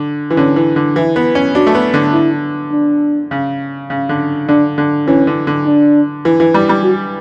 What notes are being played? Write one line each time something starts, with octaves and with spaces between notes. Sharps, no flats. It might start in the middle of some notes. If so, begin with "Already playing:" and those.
Already playing: D3
E3
D3 C#4
E3
D3
E3 E4
B3
C#4
D4 F#4
A3
B3
D3
E4
D4
C#3
C#3
D3
D3 D4
D3
E3 C#4
D3
D3
D4
E3
E3
G3
G3
F#4